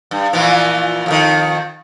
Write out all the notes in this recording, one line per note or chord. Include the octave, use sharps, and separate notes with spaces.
G2
A#2 E3 F3
F2 C3 D#3